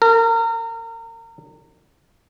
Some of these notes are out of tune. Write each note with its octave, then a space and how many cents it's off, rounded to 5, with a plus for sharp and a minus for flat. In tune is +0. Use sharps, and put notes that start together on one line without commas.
A#4 -30